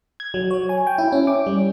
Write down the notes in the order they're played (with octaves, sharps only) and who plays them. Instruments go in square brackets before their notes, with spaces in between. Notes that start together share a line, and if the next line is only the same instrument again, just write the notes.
[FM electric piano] G#6
F#3
C#5
G#5
G5
E4
C#4
D6
G3